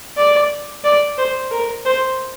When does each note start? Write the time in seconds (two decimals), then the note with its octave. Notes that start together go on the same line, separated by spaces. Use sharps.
0.17 D5
0.84 D5
1.18 C5
1.51 A#4
1.85 C5